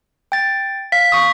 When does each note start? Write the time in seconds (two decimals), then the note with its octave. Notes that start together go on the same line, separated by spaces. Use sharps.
0.32 G5 A6
0.92 F5 B6
1.12 C#6 D#6